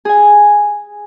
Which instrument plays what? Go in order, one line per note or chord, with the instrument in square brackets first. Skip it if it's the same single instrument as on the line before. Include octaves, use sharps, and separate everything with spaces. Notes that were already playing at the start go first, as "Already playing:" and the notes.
[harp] G#4 G#5